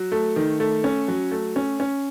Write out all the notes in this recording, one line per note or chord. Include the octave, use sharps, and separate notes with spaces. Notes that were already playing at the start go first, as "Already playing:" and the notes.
Already playing: F#3
A3
D#3
A3
C#4
F#3
A3
C#4
C#4